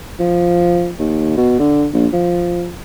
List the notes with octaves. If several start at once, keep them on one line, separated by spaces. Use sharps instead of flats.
F3
D#2
B2
D3
A#1
F3